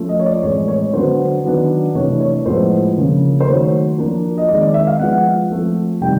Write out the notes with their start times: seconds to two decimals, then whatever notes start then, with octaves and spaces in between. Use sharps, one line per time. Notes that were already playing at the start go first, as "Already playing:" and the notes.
Already playing: F3 A3 C#4
0.09 D#5
0.19 C#5
0.26 D5
0.43 A2 E3 G#3 C4 C#5
0.68 C#5
0.93 D3 F#3 B3 D4 C5
1.44 D#3 F#3 B3 D4
1.95 C3 E3 A3 D4 C#5
2.20 C#5
2.46 A2 F3 G#3 B3 C5
2.97 C#3 F3 A#3 D4
3.40 C5
3.47 D#3 F#3 A3 C#5
3.98 F3 A#3 D4
4.38 D#5
4.48 D#3 G#3 C4 D5
4.62 D5
4.74 E5
4.87 F5
5.00 F3 G#3 B3 F#5
5.50 F3 A3 C4
6.01 C3 D#3 G3 G5